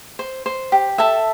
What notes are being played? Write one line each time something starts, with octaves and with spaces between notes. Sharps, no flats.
C5
C5
G4
A4 E5 A5